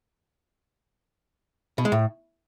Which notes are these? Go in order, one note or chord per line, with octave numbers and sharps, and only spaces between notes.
B2
G#3
A2